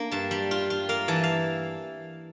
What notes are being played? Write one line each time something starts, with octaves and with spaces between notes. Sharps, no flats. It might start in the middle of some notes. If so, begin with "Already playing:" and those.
Already playing: A#3 D4
G2 A5
G3
F4
F4
A#3 F5
E3 A5
F5